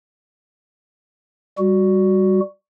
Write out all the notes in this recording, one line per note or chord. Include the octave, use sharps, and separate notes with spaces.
G3 F#4